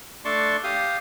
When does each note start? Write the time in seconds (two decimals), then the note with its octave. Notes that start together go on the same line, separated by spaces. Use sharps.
0.25 A3 D4 D5 A5 C6 C#6
0.64 G4 F5 D#6